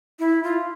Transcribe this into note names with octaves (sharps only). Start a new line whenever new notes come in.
E4
F4